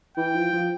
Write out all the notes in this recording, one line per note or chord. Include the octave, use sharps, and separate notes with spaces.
E3 G5
F3
F3